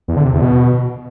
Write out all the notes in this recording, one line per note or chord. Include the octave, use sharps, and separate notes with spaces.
E2
D3
C3
E2
B2